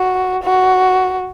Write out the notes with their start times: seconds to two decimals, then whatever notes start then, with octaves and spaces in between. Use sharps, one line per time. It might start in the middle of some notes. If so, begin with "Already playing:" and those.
Already playing: F#4
0.43 F#4